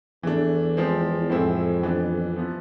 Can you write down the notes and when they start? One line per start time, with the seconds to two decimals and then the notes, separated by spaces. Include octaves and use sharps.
0.23 E2 E3 A3 D4
0.77 F3 G#3 C4
1.30 F2 A2 G#3 C4 E4
1.83 E3 B3 D4
2.36 F3 B3 E4